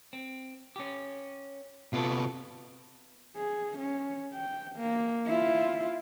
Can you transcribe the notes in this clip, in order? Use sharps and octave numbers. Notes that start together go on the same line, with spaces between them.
C4
C#4 G4
C3 B3 F4 A4
G#4
C#4
G5
A#3
E4 F4